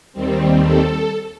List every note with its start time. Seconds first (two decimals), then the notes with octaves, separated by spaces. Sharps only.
0.13 D#2 D#3 G3 C4
0.60 A4